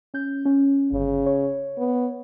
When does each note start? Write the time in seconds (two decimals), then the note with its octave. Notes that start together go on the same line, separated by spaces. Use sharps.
0.14 C#4 G6
0.45 C#4
0.92 G1 C#3
1.26 C#5
1.78 B3